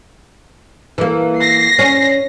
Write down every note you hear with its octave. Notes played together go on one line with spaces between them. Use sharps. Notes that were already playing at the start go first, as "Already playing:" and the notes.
E3 A#3
A#6 C7
C#4